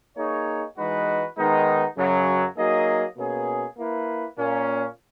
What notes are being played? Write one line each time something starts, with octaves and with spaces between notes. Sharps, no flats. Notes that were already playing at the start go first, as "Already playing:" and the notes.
A#3 D#4 G#4 C#5
E3 G#3 D#4 F#4 B4
D#3 G#3 B3 D#4
F#2 C#3 F#3
F#3 A#3 D#4 G#4 D#5
B2 A#3 C#4 G#4
A#3 E4 B4
A#2 A#3 C#4